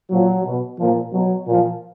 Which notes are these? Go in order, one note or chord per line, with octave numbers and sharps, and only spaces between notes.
A#2 F3 F#3
B2
A#2 F3
B2 F#3
A#2
F3